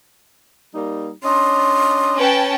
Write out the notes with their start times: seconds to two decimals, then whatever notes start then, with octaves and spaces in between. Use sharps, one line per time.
0.74 G3 A#3 D#4
1.24 C#4 D4 D#5 C6
2.18 C#4 B4 G5 A5